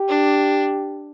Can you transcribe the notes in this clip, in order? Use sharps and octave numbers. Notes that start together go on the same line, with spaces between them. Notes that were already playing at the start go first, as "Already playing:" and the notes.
Already playing: G4
D4